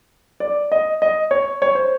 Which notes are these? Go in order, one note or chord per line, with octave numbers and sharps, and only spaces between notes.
D5
D#5
D#5
C#5
C#5
C5